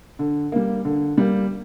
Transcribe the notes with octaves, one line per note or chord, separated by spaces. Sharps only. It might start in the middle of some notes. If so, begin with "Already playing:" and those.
D3
G3 A#3
D3
G3 A#3